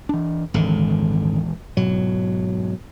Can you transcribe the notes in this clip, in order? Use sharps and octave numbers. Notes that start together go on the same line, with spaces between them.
E3 D4
D#1 G#1 D3 E3 G#3
G#2 B2 F#3